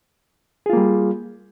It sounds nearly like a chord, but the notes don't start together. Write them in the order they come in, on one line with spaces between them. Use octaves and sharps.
G#4 F4 A#3 G3